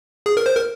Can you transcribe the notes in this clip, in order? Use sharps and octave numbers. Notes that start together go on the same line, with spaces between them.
G#4
A#4
C5
A#4